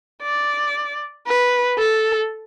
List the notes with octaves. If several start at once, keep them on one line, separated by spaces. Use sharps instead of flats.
D5
B4
A4